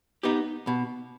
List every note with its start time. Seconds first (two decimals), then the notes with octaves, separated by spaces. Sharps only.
0.23 B3 D#4 G4
0.67 B2